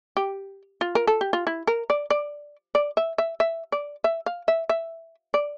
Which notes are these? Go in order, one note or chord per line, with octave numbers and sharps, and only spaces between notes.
G4
F4
A#4
A4
G4
F4
E4
A#4
D5
D5
D5
E5
E5
E5
D5
E5
F5
E5
E5
D5